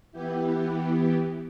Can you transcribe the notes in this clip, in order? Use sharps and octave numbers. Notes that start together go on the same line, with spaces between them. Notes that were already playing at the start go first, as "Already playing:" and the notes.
E3 B3 E4 G4